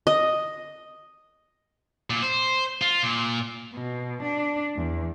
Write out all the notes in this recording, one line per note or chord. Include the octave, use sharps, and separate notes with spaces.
D#5
A#2
C5
F4
A#2
B2
D4
E2